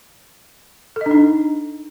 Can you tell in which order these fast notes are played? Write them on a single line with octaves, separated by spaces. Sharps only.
A4 D#5 D4 D#4